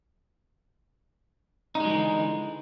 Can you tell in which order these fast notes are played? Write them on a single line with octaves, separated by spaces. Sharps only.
D#4 G#3 F#3 E3 D3